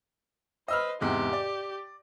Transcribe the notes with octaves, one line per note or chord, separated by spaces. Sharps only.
B4 C5 D#5 E6 F6
E2 G#2 C3 G4
D5